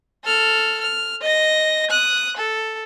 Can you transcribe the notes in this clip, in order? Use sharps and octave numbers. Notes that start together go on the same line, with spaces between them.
A4 F6
F6
D#5 A#6
D#6 F#6
A4